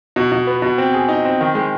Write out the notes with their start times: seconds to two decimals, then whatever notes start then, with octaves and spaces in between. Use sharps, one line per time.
0.16 B2
0.32 B2
0.47 B3
0.62 B2
0.78 C4
0.94 G#4
1.09 D#4
1.25 C4
1.41 D#3
1.55 G#3